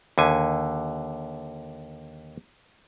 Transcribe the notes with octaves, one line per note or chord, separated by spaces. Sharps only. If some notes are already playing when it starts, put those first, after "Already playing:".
D#2 D3 G#5